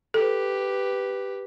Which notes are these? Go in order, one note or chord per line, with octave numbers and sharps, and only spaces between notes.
G4 A4 B4